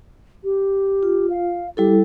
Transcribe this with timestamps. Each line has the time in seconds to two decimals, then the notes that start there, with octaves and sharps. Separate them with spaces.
0.44 G4
1.03 F4
1.30 F5
1.77 G3 E4 G4 A4